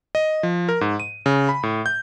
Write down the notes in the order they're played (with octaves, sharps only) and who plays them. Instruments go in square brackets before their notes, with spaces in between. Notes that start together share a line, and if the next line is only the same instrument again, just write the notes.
[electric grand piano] D#5
F3
A#4
G#2
D#7
C#3
B5
A2
G6